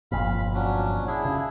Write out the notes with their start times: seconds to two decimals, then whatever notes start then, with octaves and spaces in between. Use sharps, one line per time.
0.12 G1 F2 A#2 F5 B5
0.54 F#3 C#4 D4
1.07 D4 E4 G#4
1.25 C#3